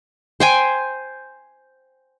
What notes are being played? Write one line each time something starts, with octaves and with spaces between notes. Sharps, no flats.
C5 G5 G#5